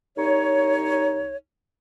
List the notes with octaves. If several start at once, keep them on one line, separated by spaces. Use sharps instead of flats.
C2 D#4 C#5